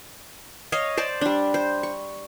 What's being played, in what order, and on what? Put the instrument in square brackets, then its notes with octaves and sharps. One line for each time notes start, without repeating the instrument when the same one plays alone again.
[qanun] C#5 D#5 F5
C5 D5 A5
G3 D4
C5
C#6